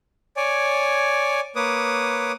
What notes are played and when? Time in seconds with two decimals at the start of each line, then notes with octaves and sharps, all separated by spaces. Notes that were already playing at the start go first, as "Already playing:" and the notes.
0.37 C#5 D5 G#5
1.56 A#3 B4 C#5 D6 D#6